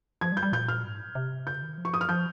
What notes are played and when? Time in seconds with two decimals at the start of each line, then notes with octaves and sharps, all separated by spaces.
0.21 F3 G#6
0.32 G3
0.37 G6
0.43 G3
0.53 A#2 G6
0.68 F6
0.84 G#2
1.15 C3
1.46 C#3 G6
1.62 D#3
1.78 F3
1.85 C#6
1.94 D#6
2.01 F6
2.09 F3 G6